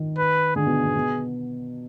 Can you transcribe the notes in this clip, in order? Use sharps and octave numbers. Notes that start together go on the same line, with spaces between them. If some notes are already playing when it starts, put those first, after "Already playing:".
Already playing: D#3
B4
D3 G#4
B2
B2
B2